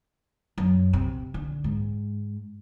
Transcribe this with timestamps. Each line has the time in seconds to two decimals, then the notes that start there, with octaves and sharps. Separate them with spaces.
0.58 F#2
0.93 C3
1.34 D3
1.64 G#2